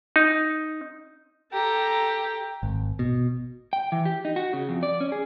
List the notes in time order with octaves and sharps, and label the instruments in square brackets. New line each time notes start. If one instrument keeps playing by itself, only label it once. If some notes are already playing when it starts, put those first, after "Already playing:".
[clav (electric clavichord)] D#4
[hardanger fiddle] G4 [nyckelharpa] A4 A#5
[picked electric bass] G#1
B2
[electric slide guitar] G5
E3
G4
D#4
F#4
C#3
F2
D5
C#4
G#4